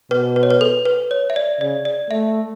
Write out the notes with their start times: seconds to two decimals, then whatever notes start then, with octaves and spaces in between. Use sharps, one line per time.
0.10 B2 B4
0.36 B4
0.43 C#5
0.50 B4
0.61 A4
0.85 B4
1.11 C#5
1.30 E5
1.36 D5
1.61 C#3 D5
1.85 D5
2.10 A3 E5